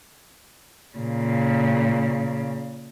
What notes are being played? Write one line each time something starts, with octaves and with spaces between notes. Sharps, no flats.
A#2 C#3